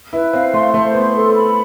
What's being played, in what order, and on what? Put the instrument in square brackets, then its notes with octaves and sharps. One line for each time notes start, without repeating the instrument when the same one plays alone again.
[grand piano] E4 [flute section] B4
[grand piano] C4 [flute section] F5
[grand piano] A3 [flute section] C6
[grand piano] A3 [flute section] C5
[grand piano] B3 [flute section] C6
[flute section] A4
B5